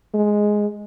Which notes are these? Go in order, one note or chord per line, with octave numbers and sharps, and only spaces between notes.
G#3